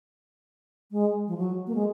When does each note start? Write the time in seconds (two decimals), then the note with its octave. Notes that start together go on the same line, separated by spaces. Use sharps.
0.92 G#3
1.27 F3
1.38 F#3
1.67 A#3
1.75 G#3